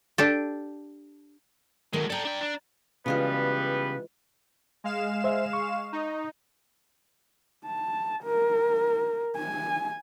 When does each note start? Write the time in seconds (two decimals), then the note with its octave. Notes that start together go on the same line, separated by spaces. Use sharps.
0.18 D4 G4 A4
1.93 B2 D#3 G#3 A3
2.10 A4 D5 G5 A#5
2.25 D4 G5
2.41 D4
3.06 C#3 E3 G3 G#3 B3 F4 F#4 B4
4.84 G#3 F5 E7
5.24 C5 E5
5.53 C#6
5.92 D#4
7.66 A5
8.24 A#4
9.36 G#5